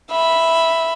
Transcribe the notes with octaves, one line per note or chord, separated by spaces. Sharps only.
E5 B5